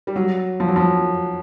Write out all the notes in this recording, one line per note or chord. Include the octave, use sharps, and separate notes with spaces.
G3
F#3
F3
F#3
F3